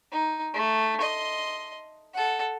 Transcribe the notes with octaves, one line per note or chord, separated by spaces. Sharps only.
D#4
A3
D#5 C6
A4 F#5